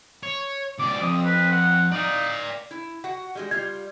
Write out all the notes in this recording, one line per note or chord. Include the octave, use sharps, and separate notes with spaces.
C#5
C#2 D5 D6
F2 D#6
B4
F#5
D#4 D5 F5
E4
F#4 F#5
G3 G#3 F#4
G3 F4 G#6